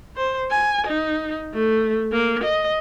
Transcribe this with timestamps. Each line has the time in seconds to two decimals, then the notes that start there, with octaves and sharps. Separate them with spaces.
0.16 C5
0.51 G#5
0.87 D#4
1.54 A3
2.12 A#3
2.44 D#5